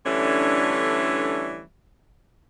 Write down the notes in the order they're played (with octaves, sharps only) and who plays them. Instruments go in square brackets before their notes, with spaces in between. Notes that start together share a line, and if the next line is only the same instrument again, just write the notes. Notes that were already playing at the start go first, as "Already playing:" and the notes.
[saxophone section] D3 E3 G3 A3 C#4 D4